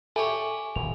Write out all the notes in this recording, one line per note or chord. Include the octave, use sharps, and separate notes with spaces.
E4 G4 A4 C#5 G#5
D#1 F7